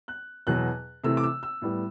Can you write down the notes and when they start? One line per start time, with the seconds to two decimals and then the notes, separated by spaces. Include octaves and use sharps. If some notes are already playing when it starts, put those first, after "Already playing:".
0.08 F#6
0.47 E2 B2 F#3 F#6
1.04 C3 E3 A3 E6
1.17 D6
1.23 E6
1.43 E6
1.62 A2 G3 B3